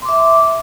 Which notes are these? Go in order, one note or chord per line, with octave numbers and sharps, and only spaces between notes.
E5 C6 D6